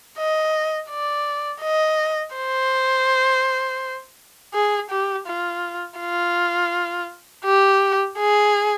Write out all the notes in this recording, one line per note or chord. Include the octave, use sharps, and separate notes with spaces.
D#5
D5
D#5
C5
G#4
G4
F4
F4
G4
G#4